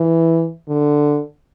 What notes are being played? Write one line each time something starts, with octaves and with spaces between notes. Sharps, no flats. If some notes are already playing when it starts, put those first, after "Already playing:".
Already playing: E3
D3